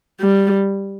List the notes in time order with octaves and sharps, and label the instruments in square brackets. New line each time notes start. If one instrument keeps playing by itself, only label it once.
[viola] G3